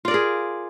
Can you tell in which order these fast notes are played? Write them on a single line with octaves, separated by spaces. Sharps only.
F4 D5 A#4 G#4